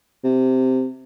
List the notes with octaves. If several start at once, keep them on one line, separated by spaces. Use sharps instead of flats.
C3